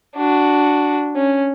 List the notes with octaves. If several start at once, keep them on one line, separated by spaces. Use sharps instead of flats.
D4 F#4
C#4